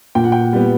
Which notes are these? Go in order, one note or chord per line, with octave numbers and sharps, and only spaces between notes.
A#2 G5
F#5
G5
G3 B3